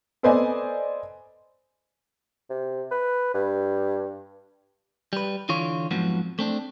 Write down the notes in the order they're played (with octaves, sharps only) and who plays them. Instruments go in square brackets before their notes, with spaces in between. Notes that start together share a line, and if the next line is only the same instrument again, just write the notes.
[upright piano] A4 B4 C5 D5 D#5 G#5
[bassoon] C3
B4
G2
[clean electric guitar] G3 B4
D3 E3 F4 C#5
F2 G#2 F3 F#3 B3
A3 C4 D4